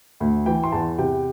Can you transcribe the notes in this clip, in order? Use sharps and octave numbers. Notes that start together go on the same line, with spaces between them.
D2
E3 G5
C6
E2 A5
C3 G5